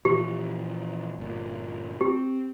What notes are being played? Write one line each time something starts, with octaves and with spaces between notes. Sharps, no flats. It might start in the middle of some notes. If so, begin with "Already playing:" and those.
A#2 E3 F3 G4
G1 A#2
C4 G4